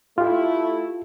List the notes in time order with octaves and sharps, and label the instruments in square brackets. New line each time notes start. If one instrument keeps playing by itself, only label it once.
[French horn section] A3 E4 [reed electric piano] F4 G4